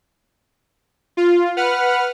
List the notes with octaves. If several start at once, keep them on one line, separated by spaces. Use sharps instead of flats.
F4
B4 F#5 F6